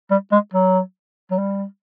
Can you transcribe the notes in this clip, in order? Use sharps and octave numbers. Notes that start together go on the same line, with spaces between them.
G3
G#3
F#3
F#3
G3